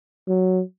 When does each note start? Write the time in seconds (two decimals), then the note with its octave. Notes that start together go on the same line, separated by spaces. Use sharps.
0.28 F#3